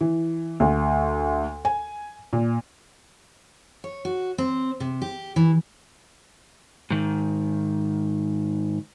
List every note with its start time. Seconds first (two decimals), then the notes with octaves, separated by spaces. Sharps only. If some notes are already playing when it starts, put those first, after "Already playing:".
0.01 E3
0.60 D2
1.65 G#5
2.33 A#2
3.84 C#5
4.05 F#4
4.38 C4
4.80 C3
5.02 G4
5.36 E3
6.91 G#2 D#3